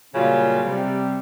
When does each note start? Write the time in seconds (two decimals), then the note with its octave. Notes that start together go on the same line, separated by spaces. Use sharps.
0.15 A#2 C#3 F#3 G3 C#4 F4
0.66 C3 G3